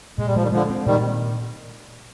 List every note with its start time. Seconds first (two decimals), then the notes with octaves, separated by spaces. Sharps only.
0.18 A#2 G#3
0.27 G3
0.35 F3 G#3
0.43 D#3 G3
0.52 D3 F3 G#3
0.70 C4
0.86 A#2 D#3 G3